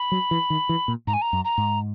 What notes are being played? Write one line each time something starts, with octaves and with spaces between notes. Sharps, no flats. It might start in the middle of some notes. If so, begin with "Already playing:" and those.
Already playing: B5
F#3
E3
D#3
E3
A#2
G#2 A#5
G#5
A#5
F#2
A#5
G#2